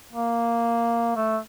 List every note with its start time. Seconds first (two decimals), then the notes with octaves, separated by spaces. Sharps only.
0.13 A#3
1.16 A3